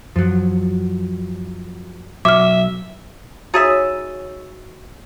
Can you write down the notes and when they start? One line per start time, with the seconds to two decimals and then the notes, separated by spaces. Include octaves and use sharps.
0.16 F#2 F3 F#3
2.25 B1 F#3 E5 D6 F6
3.54 D#4 F#4 G#4 C#5 E5 A6 D#7